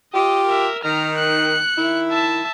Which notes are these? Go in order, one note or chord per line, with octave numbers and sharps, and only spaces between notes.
F4 G4 D#5
A#4 E5
D#3 A#5 F6
F#6 C#7
D#3 E4
E5 A5